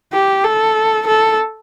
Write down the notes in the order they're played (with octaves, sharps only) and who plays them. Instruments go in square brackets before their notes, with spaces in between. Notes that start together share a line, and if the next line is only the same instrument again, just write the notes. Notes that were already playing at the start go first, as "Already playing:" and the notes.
[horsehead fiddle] G4
A4
A4